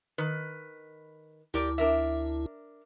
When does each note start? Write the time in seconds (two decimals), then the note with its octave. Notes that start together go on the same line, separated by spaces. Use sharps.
0.18 D#3 B4
1.54 D2 E4 G4 A#4 D5
1.78 D4 A#4 E5